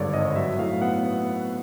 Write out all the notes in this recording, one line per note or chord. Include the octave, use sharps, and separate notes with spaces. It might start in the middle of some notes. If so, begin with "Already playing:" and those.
Already playing: G#1 G2 D3 C#5 D5
G#1 D#5
F#3 E5
A2 F5
B3 F#5
B3